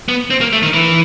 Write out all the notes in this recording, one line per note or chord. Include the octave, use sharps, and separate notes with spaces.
B3
C4
A#3
A3
D#3
E3